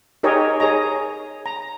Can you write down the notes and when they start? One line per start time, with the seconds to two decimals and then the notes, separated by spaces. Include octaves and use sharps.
0.23 D#4 G4 G#4 A#4 C#5 D#5
0.60 G#4 C#5 D#5 A#5
1.46 A#5